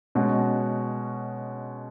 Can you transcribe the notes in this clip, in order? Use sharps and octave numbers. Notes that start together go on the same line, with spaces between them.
B2 G#3 C#4 F#4